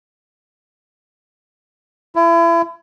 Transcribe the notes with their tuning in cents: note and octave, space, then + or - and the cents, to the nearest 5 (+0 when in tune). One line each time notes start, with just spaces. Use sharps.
E4 +35